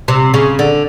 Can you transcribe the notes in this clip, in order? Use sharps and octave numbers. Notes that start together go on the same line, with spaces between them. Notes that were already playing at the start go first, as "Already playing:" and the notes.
C3
C#3
D3